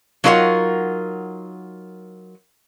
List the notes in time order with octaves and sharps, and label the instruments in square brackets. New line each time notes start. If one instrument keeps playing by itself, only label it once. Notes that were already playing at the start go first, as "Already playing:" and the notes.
[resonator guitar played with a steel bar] F#3 D#4 F4 A#4 D5 F#5